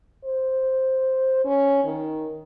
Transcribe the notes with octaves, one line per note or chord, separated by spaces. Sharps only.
C5
C#4
D#3